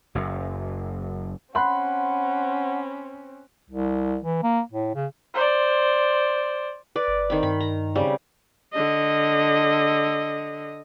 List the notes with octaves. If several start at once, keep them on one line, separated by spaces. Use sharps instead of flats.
F#1 F#2
C4 C#4 F#5 B5 C6 F#6
C2
E3
A#3
A2
C#3
C5 D5
B4 D5
G1
D#3 C4 B5
G2 B5
A#5
C#3 G3 C4
D3 D#5